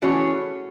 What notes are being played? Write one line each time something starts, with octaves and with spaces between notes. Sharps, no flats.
E3 A3 C#4 F#4 G#4 C#5